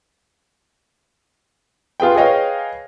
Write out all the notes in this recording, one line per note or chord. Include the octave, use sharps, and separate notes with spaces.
F4 G#4 B4 G5
G#4 B4 C#5 D#5 F5 G5